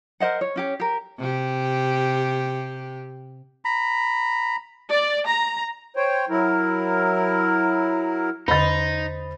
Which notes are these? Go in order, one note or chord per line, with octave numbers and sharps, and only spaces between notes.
A#4 C5 D#5 F#5
C#5
C#4 G4 C#5
G4 A#4
C3 G4
A#5 B5
D5
A#5
C5 C#5 G5
F#3 E4 A#4
E2 D3 D#4 C5 D#5 B5 A6